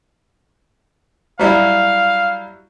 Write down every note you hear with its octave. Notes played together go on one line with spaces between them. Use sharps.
F#3 G3 E4 F5